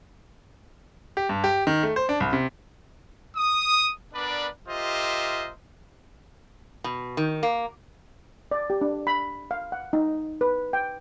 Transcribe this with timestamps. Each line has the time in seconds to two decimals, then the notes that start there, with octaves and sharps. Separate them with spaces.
1.17 G4
1.29 G2
1.44 G4
1.67 D#3
1.83 A3
1.96 C5
2.09 D4
2.20 C2
2.33 C3
3.37 D#6
4.13 B3 D4 A#4 B4 D5
4.68 F4 G4 A#4 C5 D#5 E5
6.84 B2
7.17 D#3
7.43 A#3
8.51 D5
8.70 G4
8.81 D4
9.07 B5
9.51 F5
9.72 F#5
9.93 D#4
10.41 B4
10.73 G5